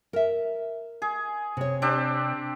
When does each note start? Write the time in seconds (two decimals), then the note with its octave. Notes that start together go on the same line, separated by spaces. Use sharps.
0.13 A#4 E5
1.02 G#4
1.57 C3 C#5
1.82 C4 D4 G4